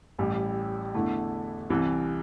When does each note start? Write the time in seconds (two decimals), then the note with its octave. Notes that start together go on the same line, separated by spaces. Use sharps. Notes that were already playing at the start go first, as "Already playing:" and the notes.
0.19 A1 A2 G3
0.94 E2 D3 A3 E4
1.70 C2 C3 E3